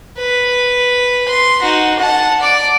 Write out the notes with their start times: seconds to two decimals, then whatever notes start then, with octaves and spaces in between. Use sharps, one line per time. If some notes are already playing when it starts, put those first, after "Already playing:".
0.18 B4
1.29 C6
1.62 D#4 F#4
2.00 F#5 A5
2.41 D5 D6